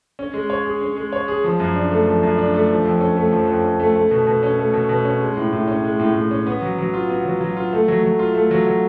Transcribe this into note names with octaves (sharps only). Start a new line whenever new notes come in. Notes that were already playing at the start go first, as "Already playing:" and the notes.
C#4
G#3
C#5
G#4
C#4
G#3
C#5
G#4
F3
F#2
D4
A3
F3
F#2
D4
A3
F3
F2
C#4
A3
F3
F2
C#4
A3
A3
B2
B2
C#4
A3
B2
B2
C#4
G#3
A2
A2
C#4
G#3
A2
A2
C#4
B3
F#3
F#3
F4
B3
F#3
F#3
F4
A3
F#3
F#3
F4
A3
F#3
F#3